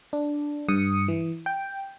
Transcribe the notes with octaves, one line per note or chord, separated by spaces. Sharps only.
D4
G2 D#6 C#7
E3
G5